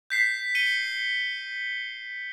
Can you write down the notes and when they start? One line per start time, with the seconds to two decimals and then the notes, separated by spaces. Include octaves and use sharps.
0.10 G6 B6 C7
0.55 C#7 D#7 G7